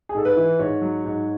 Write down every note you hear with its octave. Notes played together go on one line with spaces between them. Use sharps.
G#4
G#2 A4
B4
E3
G#2 C#5
F#3
G#2